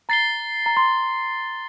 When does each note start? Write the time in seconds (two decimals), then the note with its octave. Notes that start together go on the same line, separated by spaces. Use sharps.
0.09 A#5 A6 C7 G7
0.66 A#5
0.77 C6